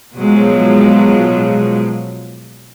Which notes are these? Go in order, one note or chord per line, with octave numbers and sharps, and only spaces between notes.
B2 F3 F#3 G#3